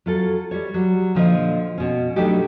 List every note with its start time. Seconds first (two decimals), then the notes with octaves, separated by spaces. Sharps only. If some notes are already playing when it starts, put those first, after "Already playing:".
0.06 F#3 F4 A4
0.51 G3 C#5
0.74 F#3 G3
1.15 A#2 D3 F3 F4 D#5
1.78 B2 C#4
2.16 F#3 G3 A3 D4 D#4 G4